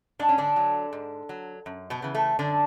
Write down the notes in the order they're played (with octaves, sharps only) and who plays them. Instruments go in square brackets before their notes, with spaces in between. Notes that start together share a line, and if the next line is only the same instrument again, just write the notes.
[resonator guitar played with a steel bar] G#2 D4
C#4
D3 D4
F#3
G#2
F#3
F#2
B2 B3
C#3 E3
A3
F#2 D3 D4